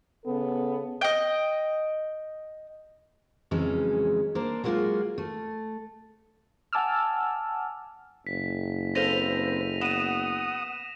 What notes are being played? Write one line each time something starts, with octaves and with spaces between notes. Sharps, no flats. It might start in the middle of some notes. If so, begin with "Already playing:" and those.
C#3 B3 A4
D#5 G5
F2 C#3 E3 F#3 G#3 C#4
A#3 D4 C5
F#3 G#3 A#3 B3 F4 F#4
A3
F#5 G#5 A5 D6 E6 F6
F#1 B6
C4 A4 B4 C5 F5 A#6 D#7 F7
B3 F#5 D#6 D#7 E7